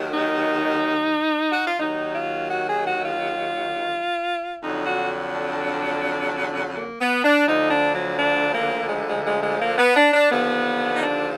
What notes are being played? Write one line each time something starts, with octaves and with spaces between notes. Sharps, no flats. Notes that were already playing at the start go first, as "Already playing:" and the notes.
Already playing: D#2 D#3 F#3
D#4
F#4
F4
D#2 D#3 F#3 D#4
F4
F#4
G#4
F#4
F4
F2 D3 F#3 D#4
F#4
D4
A#3
B3
D4
D2 D3 F3 D#4
D4
F#3
D4
A#3
G#3
G#3
G#3
G#3
A#3
B3
D4
D4
D#2 D3 F3 B3
D#4
D4